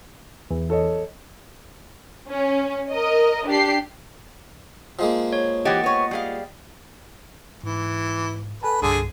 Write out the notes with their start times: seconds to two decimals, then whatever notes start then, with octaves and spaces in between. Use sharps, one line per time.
0.51 E2
0.70 A4 C#5 D#5
2.29 C#4
2.93 A#4 D#5
3.47 D4 G4 C7
4.99 F3 G#3 A#3
5.33 C#5
5.65 E3 G4 D#5 F#5 A6
5.83 B3 C#5
6.11 G3 G#4 F5
7.64 G#2 E3
8.63 A4 B4 G#5 A5
8.82 C2 G2 D3 G#4